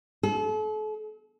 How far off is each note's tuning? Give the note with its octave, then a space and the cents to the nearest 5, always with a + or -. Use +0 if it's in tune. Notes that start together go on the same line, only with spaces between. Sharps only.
A4 -40